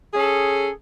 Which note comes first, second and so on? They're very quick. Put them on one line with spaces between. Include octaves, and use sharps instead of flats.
G#4 C#4 A4